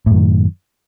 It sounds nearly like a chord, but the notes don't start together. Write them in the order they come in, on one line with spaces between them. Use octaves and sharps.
A2 F#2 D#3